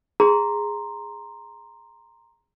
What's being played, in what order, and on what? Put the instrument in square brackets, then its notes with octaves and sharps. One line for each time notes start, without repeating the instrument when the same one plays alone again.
[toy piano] G#4 [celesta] A#5 C6